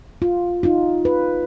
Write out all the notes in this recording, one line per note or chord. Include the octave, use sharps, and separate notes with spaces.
F4
D#4 F4
B4